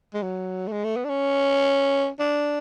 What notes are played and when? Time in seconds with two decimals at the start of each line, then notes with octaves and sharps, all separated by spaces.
0.14 G#3
0.23 F#3
0.68 A3
0.72 G#3
0.84 A3
0.96 B3
1.05 D4
1.09 C#4
2.19 D4